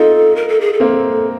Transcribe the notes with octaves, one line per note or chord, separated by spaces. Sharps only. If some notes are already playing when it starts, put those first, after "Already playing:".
Already playing: D#4 F4 A4
A#4
A4
G#4
A4
A#3 C4